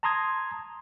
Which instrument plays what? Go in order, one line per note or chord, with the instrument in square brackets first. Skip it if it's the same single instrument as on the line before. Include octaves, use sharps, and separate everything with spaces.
[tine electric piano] A5 A#5 C6 D#6 G#6